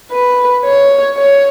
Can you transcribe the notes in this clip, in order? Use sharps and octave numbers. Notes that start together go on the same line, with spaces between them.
B4
C#5
C#5